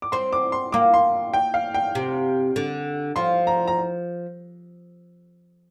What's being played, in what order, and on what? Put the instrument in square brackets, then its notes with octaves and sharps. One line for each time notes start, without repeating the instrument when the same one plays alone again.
[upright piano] D6
[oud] C4 [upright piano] C6
[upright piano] D6
C6
[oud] A#3 [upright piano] D6
[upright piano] C6
G5
F5
G5
[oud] C3
D3
[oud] F3 [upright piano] C6
[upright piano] A#5
A#5